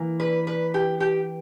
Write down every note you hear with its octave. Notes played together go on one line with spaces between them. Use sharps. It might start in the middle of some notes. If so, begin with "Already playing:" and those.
Already playing: E3 A#3
B4
B4
G4
G4